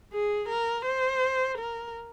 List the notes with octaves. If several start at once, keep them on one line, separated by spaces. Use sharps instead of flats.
G#4
A#4
C5
A#4